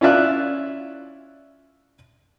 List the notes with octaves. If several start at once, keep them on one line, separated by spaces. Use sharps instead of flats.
C#4 E4 F4 D5 E5 F#6